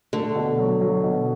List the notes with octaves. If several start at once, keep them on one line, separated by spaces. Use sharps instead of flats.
D3 A3
B2
F#3
F#3
B2